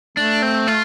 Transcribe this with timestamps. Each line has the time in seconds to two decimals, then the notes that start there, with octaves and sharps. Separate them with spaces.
0.17 A3 D4
0.42 C4
0.67 F4